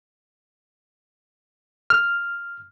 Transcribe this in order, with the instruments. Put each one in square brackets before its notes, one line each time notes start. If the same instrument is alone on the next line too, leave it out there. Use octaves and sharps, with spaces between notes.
[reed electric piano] F6